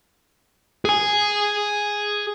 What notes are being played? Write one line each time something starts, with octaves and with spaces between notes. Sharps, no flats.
G#4 G#5